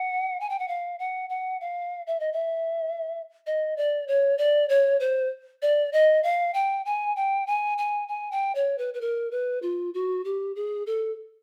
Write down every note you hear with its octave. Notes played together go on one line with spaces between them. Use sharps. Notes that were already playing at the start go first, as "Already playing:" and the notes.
Already playing: F#5
G#5
G5
F#5
F5
F#5
F#5
F5
E5
D#5
E5
D#5
D5
C#5
D5
C#5
C5
D5
D#5
F5
G5
G#5
G5
G#5
G#5
G#5
G5
C#5
B4
B4
A#4
B4
F4
F#4
G4
G#4
A4